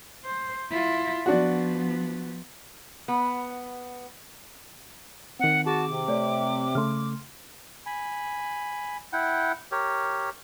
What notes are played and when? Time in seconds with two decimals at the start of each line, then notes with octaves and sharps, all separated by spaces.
0.25 C5
0.71 E4 F4
1.26 F3 B3 D4 F#4
3.08 B3
5.40 D#3 C4 F#5
5.66 F#4 G#4 A5 D6
5.89 C3
6.08 A3 C#5 D5 G5
6.75 C#3 A3 C6 F6
7.86 G#5 B5
9.13 E4 F#5 G5
9.72 G4 A#4 C#5